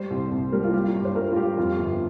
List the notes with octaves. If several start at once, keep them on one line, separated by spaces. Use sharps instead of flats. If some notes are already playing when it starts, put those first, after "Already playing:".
Already playing: G3 C5
C2
C2
G3 A#4
F4
G3 G4
F4
G2 G4
C5
G2 A#4
F4
G3 G4
F2 F4
G1